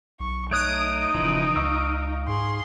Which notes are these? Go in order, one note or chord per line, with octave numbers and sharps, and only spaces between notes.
B1 C#6
A3 D#4 C#5 D#6 F#6 D7
D#1 C#3 E3 F3
C#2 F5 C#6 E6
G#2 G#4 C6